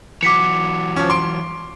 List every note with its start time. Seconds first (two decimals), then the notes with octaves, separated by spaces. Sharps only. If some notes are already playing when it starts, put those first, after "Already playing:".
0.23 E3 F#3 D6 B6 C#7
0.96 F3 C#4
1.10 C6 D7